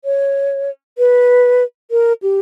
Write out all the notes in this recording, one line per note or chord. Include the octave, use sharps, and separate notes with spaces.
C#5
B4
A#4
G4